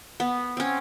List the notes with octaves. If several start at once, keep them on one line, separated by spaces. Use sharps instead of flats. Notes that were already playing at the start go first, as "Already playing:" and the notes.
B3
C4 C#4